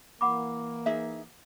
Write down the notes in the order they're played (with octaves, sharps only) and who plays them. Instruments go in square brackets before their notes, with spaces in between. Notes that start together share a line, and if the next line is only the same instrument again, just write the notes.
[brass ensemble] E3 A#3 [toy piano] F#5 B5 D6
[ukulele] D#4 G#4 E5